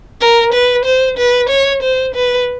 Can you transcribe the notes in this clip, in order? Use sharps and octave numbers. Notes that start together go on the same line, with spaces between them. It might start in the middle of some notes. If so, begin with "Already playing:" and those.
A#4
B4
C5
B4
C#5
C5
B4